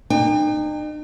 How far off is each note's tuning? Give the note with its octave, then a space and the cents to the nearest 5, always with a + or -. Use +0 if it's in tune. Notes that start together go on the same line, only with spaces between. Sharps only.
D#4 -40 G5 +35